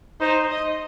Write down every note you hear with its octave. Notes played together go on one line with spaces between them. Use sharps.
D#4 C5
D#5